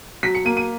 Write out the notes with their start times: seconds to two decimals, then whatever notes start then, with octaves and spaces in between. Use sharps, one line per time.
0.23 F#3 B6
0.35 C#7
0.45 A#3 D#7
0.57 D#7